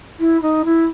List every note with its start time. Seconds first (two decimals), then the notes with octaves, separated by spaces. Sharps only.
0.19 E4
0.42 D#4
0.64 E4